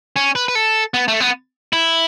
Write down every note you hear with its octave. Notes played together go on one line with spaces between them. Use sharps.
C#4
B4
B4
A4
B3
A3
B3
E4